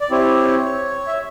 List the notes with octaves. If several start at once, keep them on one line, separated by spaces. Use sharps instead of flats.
D5
C4 E4 G4 C#5
E5